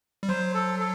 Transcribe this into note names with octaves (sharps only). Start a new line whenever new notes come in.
G3
F#3 C5
A4
A4